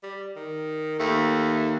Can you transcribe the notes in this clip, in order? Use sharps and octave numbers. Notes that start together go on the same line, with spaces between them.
G3
D#3
D#2 A3